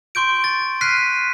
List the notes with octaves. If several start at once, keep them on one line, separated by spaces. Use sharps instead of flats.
C6 C#6 G6 D7
A6
F6 F#6 B6 C7 D#7